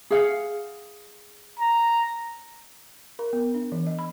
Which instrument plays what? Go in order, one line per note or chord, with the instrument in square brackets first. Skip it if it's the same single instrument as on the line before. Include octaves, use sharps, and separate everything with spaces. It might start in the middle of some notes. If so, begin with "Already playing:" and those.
[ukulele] G#4 F5 F#5
[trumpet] A#5
[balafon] A#4
B3
D4
E3
D#5
B5